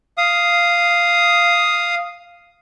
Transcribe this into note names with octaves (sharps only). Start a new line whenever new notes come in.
F5 D#6